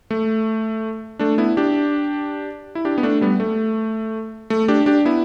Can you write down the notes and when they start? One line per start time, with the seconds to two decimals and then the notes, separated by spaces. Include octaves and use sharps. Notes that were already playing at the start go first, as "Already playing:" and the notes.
0.11 A3
1.19 A3 D4
1.38 B3 E4
1.57 D4 G4
2.75 E4
2.85 D4 G4
2.98 B3
3.03 A3 D4
3.21 G3 B3
3.40 A3
4.50 A3
4.68 D4 G4
4.86 D4 G4
5.05 B3 E4